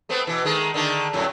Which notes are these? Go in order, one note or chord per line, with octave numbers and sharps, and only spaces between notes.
A3 B3 C4
B2 E3
D#3 G#3 A3
D3 D#3 A3
F2 A2 F#3